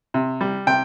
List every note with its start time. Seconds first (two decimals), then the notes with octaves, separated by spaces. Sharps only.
0.14 C3
0.41 G3
0.67 C3 G5